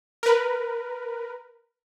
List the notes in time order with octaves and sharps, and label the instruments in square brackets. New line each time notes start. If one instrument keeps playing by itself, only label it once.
[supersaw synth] A#4 B4